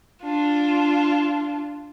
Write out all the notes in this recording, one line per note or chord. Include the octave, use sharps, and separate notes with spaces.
D4 F4